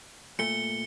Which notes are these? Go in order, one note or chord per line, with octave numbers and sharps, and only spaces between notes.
A#2 A3 C#7 G7